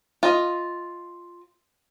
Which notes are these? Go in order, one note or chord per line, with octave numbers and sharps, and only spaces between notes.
F4 D#5